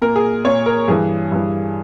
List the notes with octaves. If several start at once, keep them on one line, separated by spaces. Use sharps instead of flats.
A#2 A#4
G#4
A#2 C#5
A#4
G2 E3 G#4
G2 E3